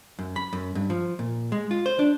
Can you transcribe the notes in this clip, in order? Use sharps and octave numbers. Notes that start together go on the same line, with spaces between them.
F#2
B5
F#2
G2
F3
A#2
G#3
F4
C5
D4